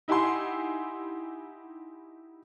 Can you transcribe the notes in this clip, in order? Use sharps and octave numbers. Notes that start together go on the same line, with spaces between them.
D#4 E4 G4 F#5 G#5 C6